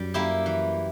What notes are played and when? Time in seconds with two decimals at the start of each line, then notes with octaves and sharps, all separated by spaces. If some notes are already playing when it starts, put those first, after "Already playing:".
Already playing: F#2 G3
0.14 A#3 E4 G4
0.46 E3